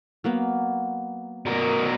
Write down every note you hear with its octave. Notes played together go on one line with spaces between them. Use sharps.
F#3 A#3 B3
B2 A#4